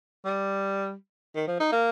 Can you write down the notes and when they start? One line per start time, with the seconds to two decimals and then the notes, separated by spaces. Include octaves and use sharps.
0.25 G3
1.36 D#3
1.47 F3
1.60 D#4
1.72 A#3